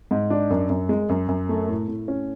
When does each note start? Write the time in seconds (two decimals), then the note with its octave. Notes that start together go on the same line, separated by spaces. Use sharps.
0.11 G#2
0.30 D4
0.50 F#2
0.70 F#2
0.89 G#3
1.09 F#2
1.28 F#2
1.49 A3
1.68 A2
1.88 A2
2.08 C#4